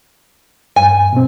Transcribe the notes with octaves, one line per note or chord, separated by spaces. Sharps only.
G2 G#5
B2 C4